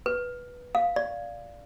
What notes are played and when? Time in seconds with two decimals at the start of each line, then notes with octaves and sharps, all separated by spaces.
0.06 B4
0.75 F5
0.96 D5